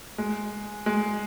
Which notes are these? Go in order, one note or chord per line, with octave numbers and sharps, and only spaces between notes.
G#3
G#3